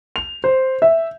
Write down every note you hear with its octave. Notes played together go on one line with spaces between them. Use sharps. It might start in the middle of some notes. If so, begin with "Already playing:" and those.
F7
C5
E5